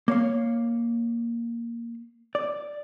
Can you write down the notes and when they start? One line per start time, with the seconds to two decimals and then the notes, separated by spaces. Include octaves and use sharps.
0.08 A#3 C#5 F5
2.35 D5